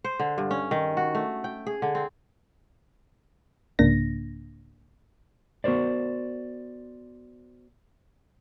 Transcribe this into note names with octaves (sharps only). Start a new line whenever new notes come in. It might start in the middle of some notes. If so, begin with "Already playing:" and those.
C5
D3
G2
C#4
D#3
F#4
A3
G5
G#4
D3
C4
C2 G#2 C#3 A#3 D4 A#6
B3 F#4 A#4 C5 D5